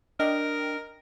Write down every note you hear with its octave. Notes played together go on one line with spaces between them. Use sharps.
D4 A#4 D#5 G5